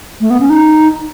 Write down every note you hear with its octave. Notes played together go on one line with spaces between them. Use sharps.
A3
B3
C#4
D#4